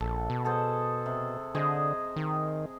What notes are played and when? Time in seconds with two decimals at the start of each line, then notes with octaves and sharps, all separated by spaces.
0.01 A#1 A4
0.30 B2
0.45 G#4 A4 C5
1.06 C3
1.55 D3 G#4 C5 D#5
2.16 D#3